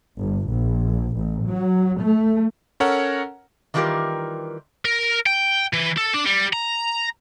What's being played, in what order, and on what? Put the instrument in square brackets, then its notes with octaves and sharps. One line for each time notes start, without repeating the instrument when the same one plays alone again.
[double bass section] G1
A#1
A1
F#3
A3
[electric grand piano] C#4 A4 A#4 C#5 F#5 A#5
[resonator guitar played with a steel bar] D#3 E3 G3 F4 G4 A#4
[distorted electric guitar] A#4
G5
E3
A4
D4
G3
A#5